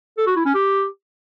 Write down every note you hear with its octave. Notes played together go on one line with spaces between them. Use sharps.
A4
F#4
E4
C#4
G4